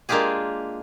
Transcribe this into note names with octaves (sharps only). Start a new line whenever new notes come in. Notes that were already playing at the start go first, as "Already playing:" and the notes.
G#3 A#3 D4 F4 G4 G#4